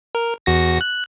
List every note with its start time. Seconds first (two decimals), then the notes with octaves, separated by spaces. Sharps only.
0.15 A#4
0.46 E2 F#4 A#6
0.81 F#6